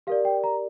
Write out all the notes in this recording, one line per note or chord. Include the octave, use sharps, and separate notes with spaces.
G4 A#4 D5 F5
G5
A#5